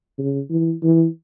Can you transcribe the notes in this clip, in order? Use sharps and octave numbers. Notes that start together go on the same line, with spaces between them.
C#3
E3
E3